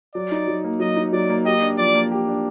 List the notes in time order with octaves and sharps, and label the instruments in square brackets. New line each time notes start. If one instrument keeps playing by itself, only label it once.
[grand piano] F#3 [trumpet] D5
[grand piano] D#4
F#3
A#3
[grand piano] F#3 [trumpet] D#5
[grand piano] D#4
[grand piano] F#3 [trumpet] D5
[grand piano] A#3
[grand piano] G4 [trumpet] D#5
[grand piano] D4
[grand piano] F3 [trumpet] D5
[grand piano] A#3
G4
D4